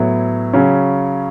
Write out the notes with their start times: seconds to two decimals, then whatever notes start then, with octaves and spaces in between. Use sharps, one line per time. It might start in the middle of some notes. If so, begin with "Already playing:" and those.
Already playing: A2 F#3 B3 E4
0.53 C#3 F#3 C#4